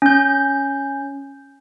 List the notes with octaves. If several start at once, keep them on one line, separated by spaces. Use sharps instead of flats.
C#4 G6